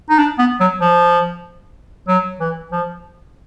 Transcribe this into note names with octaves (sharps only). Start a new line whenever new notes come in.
D#4
D4
B3
F#3
F3
F#3
E3
F3